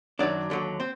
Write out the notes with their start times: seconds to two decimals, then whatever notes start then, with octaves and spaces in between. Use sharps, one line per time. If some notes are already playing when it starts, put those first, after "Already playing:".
0.19 F#2 D#3 F#3 D4 D5
0.50 D#2 D3 F#3
0.80 C4 C5